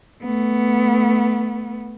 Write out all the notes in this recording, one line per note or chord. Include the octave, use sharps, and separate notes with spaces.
A3 B3